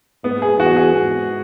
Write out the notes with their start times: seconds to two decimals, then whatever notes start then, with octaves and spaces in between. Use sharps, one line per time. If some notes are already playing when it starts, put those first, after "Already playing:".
0.24 G#2 B3
0.42 G#4
0.59 E2 F#4
0.77 G#4
0.94 G#2